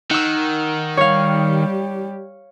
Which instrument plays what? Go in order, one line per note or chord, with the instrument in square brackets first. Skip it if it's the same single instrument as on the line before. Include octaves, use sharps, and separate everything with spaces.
[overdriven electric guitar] D#3 [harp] F#5 E6
[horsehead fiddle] G3 G4 [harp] C#5 F5